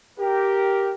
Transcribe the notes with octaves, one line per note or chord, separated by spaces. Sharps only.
G4 A#4